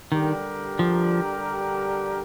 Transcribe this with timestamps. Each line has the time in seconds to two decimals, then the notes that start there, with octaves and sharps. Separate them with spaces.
0.12 D3 D#3 G3 D4 G4 A#4
0.79 F3